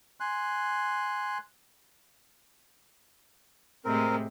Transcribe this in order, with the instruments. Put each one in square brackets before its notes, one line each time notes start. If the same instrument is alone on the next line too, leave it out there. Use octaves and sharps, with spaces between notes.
[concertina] G#5 C6 F#6
[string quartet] A2 C3 G#3 [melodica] C4 A#4